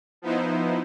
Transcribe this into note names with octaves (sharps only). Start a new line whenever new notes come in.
F3 B3 D#4 E4 C5